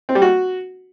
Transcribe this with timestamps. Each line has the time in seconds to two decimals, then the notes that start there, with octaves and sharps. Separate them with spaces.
0.09 C4
0.15 G3
0.22 F#4